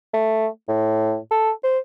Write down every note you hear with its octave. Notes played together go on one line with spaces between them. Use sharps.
A3
A2
A4
C5